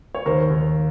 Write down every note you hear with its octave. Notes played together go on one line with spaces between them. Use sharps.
C#5
D#2 A#4 C5
D#2